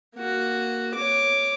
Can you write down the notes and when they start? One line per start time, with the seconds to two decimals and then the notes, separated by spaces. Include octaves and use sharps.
0.15 A#3 F#4
0.94 C#5 D6